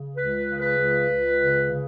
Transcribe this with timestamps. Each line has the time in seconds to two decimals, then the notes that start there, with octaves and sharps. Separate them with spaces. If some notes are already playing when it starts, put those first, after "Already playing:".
Already playing: C#3
0.16 C#2 B4
0.46 C#3
0.61 B4
0.78 C#2
1.08 C#2
1.39 C#3
1.71 C#3